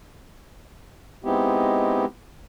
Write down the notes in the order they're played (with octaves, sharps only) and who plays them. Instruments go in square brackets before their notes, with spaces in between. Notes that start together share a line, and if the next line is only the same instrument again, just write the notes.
[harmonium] G#3 B3 C4 D#4 E4 G4